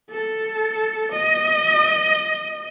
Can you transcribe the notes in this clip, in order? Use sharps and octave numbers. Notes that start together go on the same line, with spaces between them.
A4
D#5